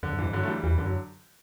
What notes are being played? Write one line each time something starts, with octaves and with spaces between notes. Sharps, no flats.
F#2 D3
F#2
G2 E3
D3 F#3
A3
E3 G3
E2 E3 G3
F#2 D3
F#3